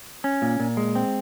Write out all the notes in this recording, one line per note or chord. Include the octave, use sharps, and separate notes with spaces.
C#4
A#2
A#2
G#3
C4